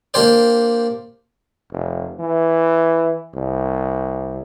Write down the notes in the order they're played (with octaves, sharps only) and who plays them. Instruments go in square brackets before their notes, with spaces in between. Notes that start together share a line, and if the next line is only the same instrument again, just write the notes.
[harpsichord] A#3 D4 G4 C5 D5
[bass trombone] F1
E3
C2